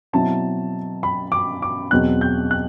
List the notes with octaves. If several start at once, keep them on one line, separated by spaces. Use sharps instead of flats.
B2 F#3 C4 E4 A5
B5
D6
D6
E2 B2 F#3 C4 F#6
G6
F#6